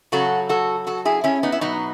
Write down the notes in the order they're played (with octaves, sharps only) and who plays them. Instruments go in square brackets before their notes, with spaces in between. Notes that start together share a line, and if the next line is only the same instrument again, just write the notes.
[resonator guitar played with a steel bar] C#3 F#3 F#4 A4
F#4 A4
F#4 A4
E4 G#4
C#4 E4
B3 D#4
E4
B2 F#3 B3 D#4